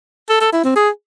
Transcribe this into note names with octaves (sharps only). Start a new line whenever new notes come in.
A4
A4
E4
C4
G#4